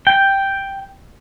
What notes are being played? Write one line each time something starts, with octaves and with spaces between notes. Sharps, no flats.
G5